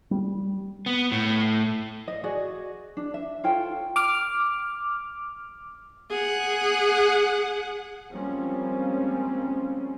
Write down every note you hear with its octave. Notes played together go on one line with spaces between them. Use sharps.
G3
B3
A2
D#5
F#4 G#4 D5 D#5
D4
E5
F4 A4 C#5 G5
D6 F6
G#4 F#5
F3 G3 G#3 A#3 C4 C#4